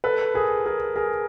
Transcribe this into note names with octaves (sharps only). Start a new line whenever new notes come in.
A4 B4
G#4 A#4
G#4 A#4
G#4 A#4